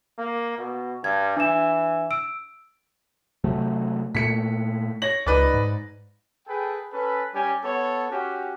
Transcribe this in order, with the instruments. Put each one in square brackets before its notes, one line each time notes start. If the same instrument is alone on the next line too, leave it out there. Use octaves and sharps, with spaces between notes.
[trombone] A#3
B2
[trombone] G2 [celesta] G#6
[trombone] E3 [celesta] D4 E7
[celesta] E6 D7
[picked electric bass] C3 F#3 A3
[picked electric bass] A#2 A3 [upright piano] B6 C#7
[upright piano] C#5 A#6 F#7
[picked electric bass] C#2 [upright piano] D#4 B4 D5
[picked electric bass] G#2
[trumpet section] G#4 A4 B4 G5
C#4 A4 B4
G3 C#4 G4 D5 G#5
B3 A4 C#5
C#4 F#4 G4